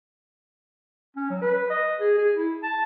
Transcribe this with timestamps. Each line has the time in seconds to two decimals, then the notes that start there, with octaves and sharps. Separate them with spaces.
1.17 C#4
1.30 F#3
1.42 B4
1.70 D#5
2.00 G#4
2.18 G#4
2.35 E4
2.63 A5